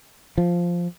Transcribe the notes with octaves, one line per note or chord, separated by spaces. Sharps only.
F3